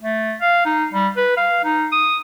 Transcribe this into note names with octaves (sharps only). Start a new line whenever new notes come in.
A3
F5
D#4
G3
B4
F5
D#4
D#6